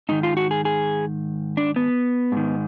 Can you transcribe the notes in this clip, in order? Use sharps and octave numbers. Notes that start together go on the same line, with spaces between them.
G#2 D#3 D#4
F4
F#4
G#4
G#4
D4
B3
G#2 D#3